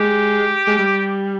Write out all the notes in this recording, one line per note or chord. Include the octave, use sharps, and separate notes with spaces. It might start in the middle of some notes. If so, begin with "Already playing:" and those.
Already playing: G#3 G4
G#3
G3